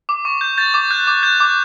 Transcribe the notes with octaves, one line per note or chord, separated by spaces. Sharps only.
D6
C#6
G6
G6 A6
D6
F#6 G6
D6
F#6 G6
D6